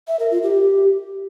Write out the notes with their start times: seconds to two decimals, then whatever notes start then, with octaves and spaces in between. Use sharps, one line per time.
0.08 E5
0.19 A#4
0.31 F4
0.43 G4